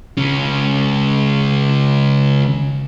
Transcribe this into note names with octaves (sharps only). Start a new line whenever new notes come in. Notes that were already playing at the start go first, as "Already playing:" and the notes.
C#2 C#4